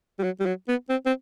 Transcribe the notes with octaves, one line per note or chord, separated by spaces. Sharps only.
G3
F#3
G3
F#3
B3
C4
C4